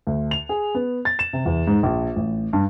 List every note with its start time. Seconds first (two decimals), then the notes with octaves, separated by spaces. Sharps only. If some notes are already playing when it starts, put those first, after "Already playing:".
0.07 D2
0.31 F7
0.49 G#4
0.75 B3
1.05 A6
1.19 E7
1.33 C3
1.46 E2
1.67 G#2
1.83 A#1
2.16 A1
2.53 G2